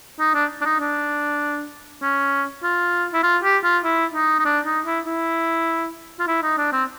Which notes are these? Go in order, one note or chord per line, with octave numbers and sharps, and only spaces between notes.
D#4
D4
D4
D#4
D4
C#4
F4
E4
F4
G4
F4
E4
D#4
D#4
D4
D#4
E4
E4
F4
E4
D#4
D4
C4